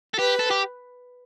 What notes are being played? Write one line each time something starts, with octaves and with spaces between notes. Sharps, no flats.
A4
G4 B4
A4
G4